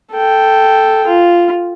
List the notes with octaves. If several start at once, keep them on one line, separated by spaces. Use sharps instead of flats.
A4 G5
F4